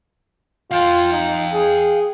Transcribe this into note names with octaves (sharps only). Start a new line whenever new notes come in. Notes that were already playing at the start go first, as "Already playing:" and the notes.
F4 F5 G5
D#4
G#4